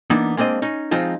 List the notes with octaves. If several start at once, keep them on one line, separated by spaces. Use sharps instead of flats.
E3 A#3 B3 D4 D#4
G#3 A#3 C4 D4 D#5
C#4 D#4
F3 G#3 C4 D#4 F4